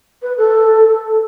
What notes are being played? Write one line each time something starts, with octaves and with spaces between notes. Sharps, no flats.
B4
A4